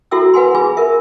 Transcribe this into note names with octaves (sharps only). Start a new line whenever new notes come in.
E4 F#4 A4 E5 G5 E6
B4 F#5 G#5 C6
F4 G#4 B4 G#5
A#4 E5